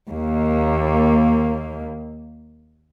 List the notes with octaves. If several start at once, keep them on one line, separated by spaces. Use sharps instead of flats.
D#2 A#3